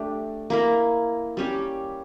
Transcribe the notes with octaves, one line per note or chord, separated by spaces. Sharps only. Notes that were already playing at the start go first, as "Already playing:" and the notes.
Already playing: A3 D4 G4
A#3 E4 A#4
G3 C#4 G4